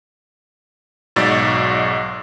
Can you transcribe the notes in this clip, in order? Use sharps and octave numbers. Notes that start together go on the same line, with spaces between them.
B1 G#2 F#4 D5 E6 A6